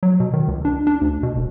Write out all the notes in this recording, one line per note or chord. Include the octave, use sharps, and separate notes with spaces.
F#3
B2
D#3
C#2
D4
D4
D2
B2
E1